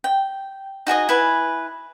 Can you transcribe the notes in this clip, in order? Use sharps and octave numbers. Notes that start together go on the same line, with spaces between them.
G5
D#4 F#4 G#4 D#5
E4 B4 G#5